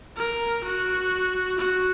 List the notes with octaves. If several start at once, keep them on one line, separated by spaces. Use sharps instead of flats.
A#4
F#4
F#4